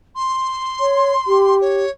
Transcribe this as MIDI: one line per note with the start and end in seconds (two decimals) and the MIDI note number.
0.16 1.55 84
0.80 1.13 73
1.27 1.85 67
1.61 1.90 73